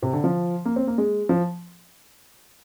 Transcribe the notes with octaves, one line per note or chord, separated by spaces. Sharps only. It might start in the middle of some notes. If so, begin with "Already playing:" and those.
C3
D3
F3
A#3
C4
A#3
G#3
F3